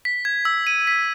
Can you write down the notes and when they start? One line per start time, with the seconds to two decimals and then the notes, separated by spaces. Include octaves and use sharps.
0.05 B6
0.25 G#6
0.45 E6
0.67 D#7
0.87 B6